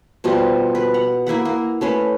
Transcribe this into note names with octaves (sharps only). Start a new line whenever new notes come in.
B2 F3 G3 F4
B4
F#5
A#3 E4 B4 F#5
A#3
A3 C#4 B4